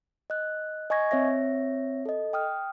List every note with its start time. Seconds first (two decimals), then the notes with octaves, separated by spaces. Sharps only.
0.30 D#5 F#6
0.90 D#5 G#5 C#6 G#6 A#6
1.11 C4 C#5 E5 A#6
2.06 A4 D#5
2.33 G5 D#6 F6